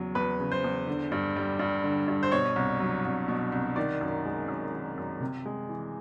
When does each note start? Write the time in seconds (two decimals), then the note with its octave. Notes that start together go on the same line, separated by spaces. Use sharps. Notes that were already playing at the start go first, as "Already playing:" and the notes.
Already playing: E2 C#3 F#3
0.15 E2 B4
0.40 C#3
0.52 C5
0.64 E2
0.87 D3
1.12 G2
1.36 G3
1.59 G2
1.84 D3
2.08 G2
2.23 C5
2.32 B2 C#5
2.56 C2
2.80 F#3
3.05 C2
3.28 B2
3.52 C2
3.76 D#3 D5
4.01 F#2
4.25 G#3
4.48 F#2
4.73 D#3
4.97 F#2
5.20 C3
5.46 G#3
5.69 E3